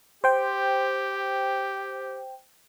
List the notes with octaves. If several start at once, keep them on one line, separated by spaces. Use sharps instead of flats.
G4 C5 G5